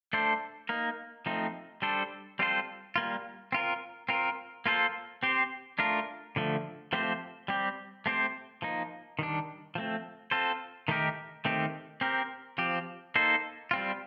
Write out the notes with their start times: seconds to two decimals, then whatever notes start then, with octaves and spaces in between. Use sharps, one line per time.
0.13 A3 D4 A4 C5
0.69 A#3 D#4 A#4
1.26 F3 A3 C4 D#4
1.82 G3 D4 A4 C5
2.39 G3 C4 F4 A4 C5
2.96 G3 A#3 F4
3.52 C4 F4 A#4
4.09 C4 F4 A#4
4.66 A#3 F4 A4 C5
5.23 C4 G4 C5
5.79 A3 D4 F4 A#4
6.36 D3 F3 A3
6.93 F3 A3 C4 G4 C5
7.48 G3 C4 G4
8.06 A3 C4 G4 C5
8.62 F3 A#3 D#4
9.19 D#3 G3 D4
9.75 F3 A3 C4
10.31 C4 F4 A4 C5
10.88 D#3 A3 D#4 G4 A#4
11.45 D#3 A3 C4 G4
12.01 C4 G4 A#4
12.58 F3 C4 G4
13.15 A#3 D#4 A4 C5
13.71 G3 C4 F4